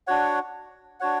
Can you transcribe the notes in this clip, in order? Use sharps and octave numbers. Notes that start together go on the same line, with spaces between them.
D4 F#4 C#5 F#5
D4 F#4 C#5 F#5